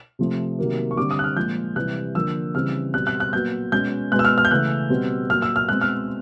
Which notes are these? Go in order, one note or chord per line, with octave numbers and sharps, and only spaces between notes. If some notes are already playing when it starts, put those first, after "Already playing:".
C3 F3 A3 C4
C3 D#3 F#3 A#3
C#6
D3 G3 C4 D6
D#6
F#6
F6
A#2 F3 G#3 G6
C3 E3 G3 F#6
D3 F3 A#3 E6
C#3 E3 G3 C4 F6
B2 G3 C4 F#6
F#6
F#6
A#2 F#3 B3 G6
B2 G#3 C#4 G6
B2 G#3 B3 F#6
E6
F6
F6
G6
C#3 E3 A3 C#4 F#6
B2 G3 C4
A#2 F#3 A#3 F6
E6
F6
B2 G#3 C4 F#6
F6